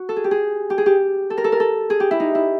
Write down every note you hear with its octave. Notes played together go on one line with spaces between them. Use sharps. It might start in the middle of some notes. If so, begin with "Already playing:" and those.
Already playing: F#4
A4
G#4
G4
G#4
G4
G#4
G4
A4
A#4
A4
A#4
A4
G#4
G4
E4
D#4
E4